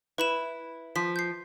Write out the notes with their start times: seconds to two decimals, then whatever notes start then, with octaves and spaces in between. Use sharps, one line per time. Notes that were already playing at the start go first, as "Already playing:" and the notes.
0.18 E4 B4 B5 E7
0.96 F3 B6
1.16 G6 C7